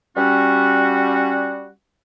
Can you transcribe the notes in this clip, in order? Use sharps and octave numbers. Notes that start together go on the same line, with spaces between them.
G3 C#4 F#4